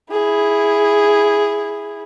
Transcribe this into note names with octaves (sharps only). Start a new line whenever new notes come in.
E4 G#4